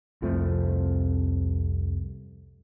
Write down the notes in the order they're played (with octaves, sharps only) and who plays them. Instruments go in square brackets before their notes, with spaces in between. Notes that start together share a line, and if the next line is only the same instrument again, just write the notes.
[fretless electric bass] C2 F2 F3 A3